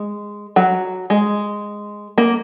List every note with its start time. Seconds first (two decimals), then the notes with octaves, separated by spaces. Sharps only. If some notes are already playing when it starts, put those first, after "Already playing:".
Already playing: G#3
0.56 F#3
1.10 G#3
2.18 A#3